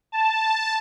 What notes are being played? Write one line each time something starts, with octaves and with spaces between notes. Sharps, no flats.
A5